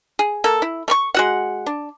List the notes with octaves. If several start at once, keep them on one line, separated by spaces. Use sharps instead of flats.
G#4
A#3 A4
E4
A3 C#6
G#3 F#4 F#5
D4